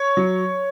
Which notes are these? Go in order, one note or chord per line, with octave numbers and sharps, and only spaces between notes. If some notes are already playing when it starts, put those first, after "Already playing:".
Already playing: C#5 C#6
F#3